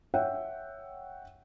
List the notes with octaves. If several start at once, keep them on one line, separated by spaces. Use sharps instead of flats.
C#5 E5 F#5 G5